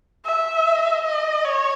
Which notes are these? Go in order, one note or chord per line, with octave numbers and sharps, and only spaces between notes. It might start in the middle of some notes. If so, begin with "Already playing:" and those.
E5
D#5
C#5